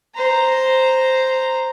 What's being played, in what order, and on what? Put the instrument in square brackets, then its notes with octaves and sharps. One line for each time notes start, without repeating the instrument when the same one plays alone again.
[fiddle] C5 A#5